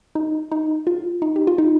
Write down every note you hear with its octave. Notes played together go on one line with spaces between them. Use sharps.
D#4
D#4
F4
D#4
G4
F4
D#4